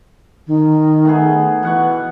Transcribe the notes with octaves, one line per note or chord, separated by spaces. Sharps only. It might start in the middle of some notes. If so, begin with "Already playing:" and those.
D#3
A3 B3 G#4
B2 E3 F#5 C#6